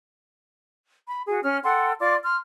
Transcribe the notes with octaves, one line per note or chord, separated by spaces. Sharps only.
B5
F#4 G#4
C#4 F6
A4 F#5 G5 C6
F4 D5 C6 D6
C6 F6